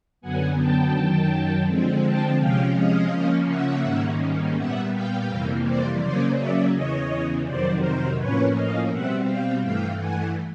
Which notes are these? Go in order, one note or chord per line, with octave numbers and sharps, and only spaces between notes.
F#2 D3 F#3 B3 F#5 G#5
G5 A5
F#2 D#3 F#3
D3 F3 G#3 C4
G5 A5
C3 F3 G#3 C#4 F5 G5
D#5 F5
C#3 F3 A#3 C#4
E5 F#5
G#2 D#3 G3 A#3 C#4
A#2 G3 B3 E5 F#5
F5 G5
F2 C3 E3 G3 A#3
C5 D5
C#3 F#3 A#3 C#4 C5 D5
D5 E5
E2 C#3 E3 C#5 D#5
F2 C3 D#3 F#3 C5 D5
A#4 C5
A2 F3 A#3 C#4 B4 C#5
D#5 F5
B2 G3 C4 E5 F#5
F5 G5
G2 E3 A3 F5 G5
F#5 G#5